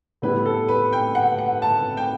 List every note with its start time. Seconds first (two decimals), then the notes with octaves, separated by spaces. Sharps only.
0.22 A2 G3 B3 E4 B4
0.46 A4
0.68 B4
0.93 G5
1.15 F#5
1.38 F#5
1.62 A5
1.97 G5